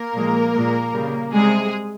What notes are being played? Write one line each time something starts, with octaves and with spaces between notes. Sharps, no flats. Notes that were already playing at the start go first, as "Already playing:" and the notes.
Already playing: A#3 A#4
A#2 F3 G#3
G#3
A#2
C#3 G3
C3 G3 G#3 G#4